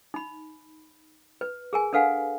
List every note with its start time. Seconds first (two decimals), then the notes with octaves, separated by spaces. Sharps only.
0.14 D#4 B5
1.41 B4
1.73 G#4 A#4 G#5
1.93 D4 A4 B4 F5 F#5 G#5